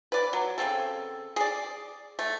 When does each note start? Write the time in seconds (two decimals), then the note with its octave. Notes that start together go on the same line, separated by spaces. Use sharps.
0.12 B4 D5
0.33 F#3
0.58 C#3 F3 C4 A4
1.36 G#4 D5
2.19 A3